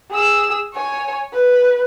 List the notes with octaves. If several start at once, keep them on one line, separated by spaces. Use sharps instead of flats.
G#4 E6
C#5 G#5
B4